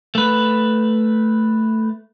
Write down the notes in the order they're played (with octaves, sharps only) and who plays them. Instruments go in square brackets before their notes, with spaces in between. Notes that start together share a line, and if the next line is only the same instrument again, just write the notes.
[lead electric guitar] A3 B4